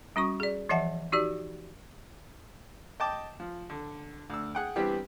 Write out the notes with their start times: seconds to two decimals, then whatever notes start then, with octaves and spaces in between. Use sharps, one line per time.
0.16 G3 C#4 F#4 C#6
0.40 G#4 D5
0.69 E3 F3 D#5 E5 F#5 A5
1.12 D#4 F#4 G4 D5
3.00 D#5 G5 A5 D6
3.40 F3
3.70 D3
4.30 D2 E6
4.55 G#4 F#5 G5
4.76 E3 G3 B3 C4 D4 G4